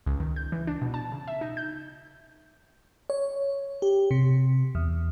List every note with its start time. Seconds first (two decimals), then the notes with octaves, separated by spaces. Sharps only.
0.06 C#2
0.20 D#3
0.36 G6
0.52 E3
0.67 D4
0.82 B2
0.94 A5
1.12 C#3
1.28 E5
1.41 D#4
1.57 G6
3.10 C#5
3.82 G4
4.11 C3
4.75 E2